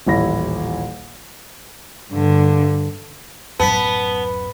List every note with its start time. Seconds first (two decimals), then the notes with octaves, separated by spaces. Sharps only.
0.07 D#1 A1 E4 A#6
2.12 G2 D3
3.59 D1 F#2 B3 A5 B6